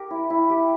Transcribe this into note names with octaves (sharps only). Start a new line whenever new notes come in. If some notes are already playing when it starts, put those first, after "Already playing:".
Already playing: G4 A#4
E4
E4
G4